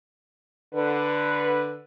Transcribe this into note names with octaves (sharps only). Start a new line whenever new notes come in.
D3 B4